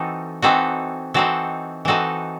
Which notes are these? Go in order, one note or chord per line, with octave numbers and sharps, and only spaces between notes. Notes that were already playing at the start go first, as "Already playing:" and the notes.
Already playing: E3 C4 D#4 F#4 A4
E3 C4 D#4 F#4 A4
E3 C4 D#4 F#4 A4
E3 C4 D#4 F#4 A4